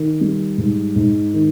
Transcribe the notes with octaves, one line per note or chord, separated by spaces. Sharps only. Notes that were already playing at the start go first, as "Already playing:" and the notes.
Already playing: D#3
G3
G#2
G#2
D#3